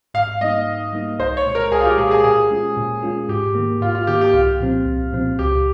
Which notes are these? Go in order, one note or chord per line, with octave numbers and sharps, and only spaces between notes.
G#2 F5
G3 A#3 D#4 D#5
G#2
G3 A#3 D#4
C2 C5
C#5
A#2 G#3
A#4
C2 G#4
F4
G4
A#2 G#3 G#4
G#4
A#2 G#4
G#3 C#4 F4
A#2
G#3 C#4 F4
G#2 G4
D#3 A#3
G#2 F4
F4
D#3 A#3 G4
G4
C2 F4
A#2 F3 C4
C2
A#2 F3 C4
C#2 G4